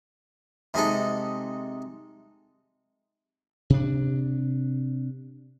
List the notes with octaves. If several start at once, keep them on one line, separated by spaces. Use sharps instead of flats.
C3 G#3 D#4 A4
C3 D4